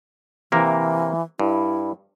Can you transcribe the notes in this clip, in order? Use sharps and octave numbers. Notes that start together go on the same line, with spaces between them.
C3 E3 A#3 A#4
G2 E4